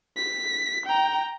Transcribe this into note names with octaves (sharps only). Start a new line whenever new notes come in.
B6
G5 A#5